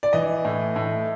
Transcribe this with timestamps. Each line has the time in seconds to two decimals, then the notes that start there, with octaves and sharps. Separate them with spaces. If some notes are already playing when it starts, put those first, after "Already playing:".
0.03 D5
0.13 E3 D#5
0.45 A2
0.76 A2